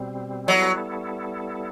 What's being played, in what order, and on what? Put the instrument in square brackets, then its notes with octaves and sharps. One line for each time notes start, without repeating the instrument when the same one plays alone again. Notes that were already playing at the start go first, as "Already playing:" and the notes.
Already playing: [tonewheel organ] B2 G3 C4
[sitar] F#3 [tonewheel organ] G3 B3 E4 A4